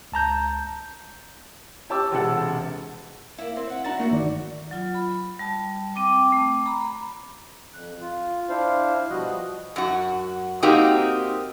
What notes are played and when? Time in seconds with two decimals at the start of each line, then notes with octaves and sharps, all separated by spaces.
0.12 C#2 A5 A#5 G6
1.90 G4 C#5 A5 D6 E6
2.11 E1 C3 A4 F#5
3.38 A#3 E4
3.56 C4
3.70 E5 F#5
3.84 D4 E4 F#4 A#5 A6
3.99 A3 A#3 F#4
4.11 G1 D#3 D5
4.71 F#3 F4
4.94 B5
5.39 G3 A5
5.95 C4 G5 D6
6.32 A3 D6
6.66 A#5 B5
7.74 F2 F#6
8.01 F4
8.50 D4 E4 C5 F5
9.10 B2 F3 G3 F#4 D#5 F#6
9.76 F#2 F#4
10.62 A#3 C4 D#4 F#4 G4